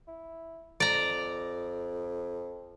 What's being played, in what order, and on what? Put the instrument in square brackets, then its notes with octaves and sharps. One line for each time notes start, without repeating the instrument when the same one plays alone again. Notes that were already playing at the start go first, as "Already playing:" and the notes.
[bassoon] E4
[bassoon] F2 [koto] D5 A#5